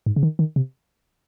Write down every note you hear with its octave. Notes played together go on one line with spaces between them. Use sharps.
G#2
C#3
D#3
D#3
C3